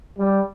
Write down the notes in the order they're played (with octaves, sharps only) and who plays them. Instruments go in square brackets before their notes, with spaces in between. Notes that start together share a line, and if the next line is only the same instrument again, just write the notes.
[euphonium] G3